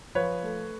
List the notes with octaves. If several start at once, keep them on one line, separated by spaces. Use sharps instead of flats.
F3 B4 C#5
A3